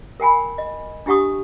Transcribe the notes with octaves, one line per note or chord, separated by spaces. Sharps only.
A#4 G5 G#5 B5
D#5
D4 E4 G4 F#5 C#6 D#6